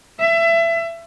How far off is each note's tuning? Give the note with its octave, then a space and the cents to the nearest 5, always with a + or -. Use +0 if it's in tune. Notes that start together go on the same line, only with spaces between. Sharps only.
E5 +25